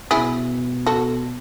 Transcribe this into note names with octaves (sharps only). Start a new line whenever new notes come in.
B2 E4 G#4
F#4 A4